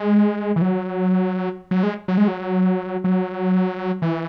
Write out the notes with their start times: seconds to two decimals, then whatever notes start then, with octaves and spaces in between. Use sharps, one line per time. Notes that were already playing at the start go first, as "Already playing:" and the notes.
Already playing: G#3
0.56 E3
0.62 F#3
1.71 F#3
1.83 G#3
2.08 F#3
2.18 G#3
2.28 F#3
3.04 F#3
4.02 E3